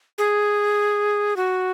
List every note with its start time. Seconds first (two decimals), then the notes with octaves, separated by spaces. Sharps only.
0.18 G#4
1.37 F#4